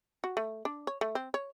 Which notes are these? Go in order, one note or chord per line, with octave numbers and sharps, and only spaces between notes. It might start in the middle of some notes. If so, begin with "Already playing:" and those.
F#4
A3
D4
C#5
A3
C4
C#5